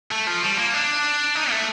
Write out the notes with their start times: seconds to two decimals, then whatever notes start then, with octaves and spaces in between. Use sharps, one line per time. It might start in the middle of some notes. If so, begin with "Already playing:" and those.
0.11 A3
0.27 F3
0.42 G3
0.58 A#3
0.74 D4
1.35 D#4
1.50 A3